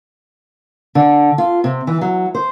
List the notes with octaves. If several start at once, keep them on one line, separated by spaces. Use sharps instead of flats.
D3
F4
C3
E3
F#3
C5